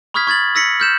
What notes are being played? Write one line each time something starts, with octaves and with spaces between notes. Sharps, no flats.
B5 C#6 D#6 F6 G#6 B6
C#6 G#6 A6 F#7
E6 A#6 B6 C#7 F#7
F6 G6 E7